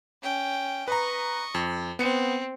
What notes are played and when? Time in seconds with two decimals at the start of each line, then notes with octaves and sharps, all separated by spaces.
0.23 C#4 G5
0.88 B4 D#5 A#5 C#6
1.55 F2
1.99 B3 C4 C#7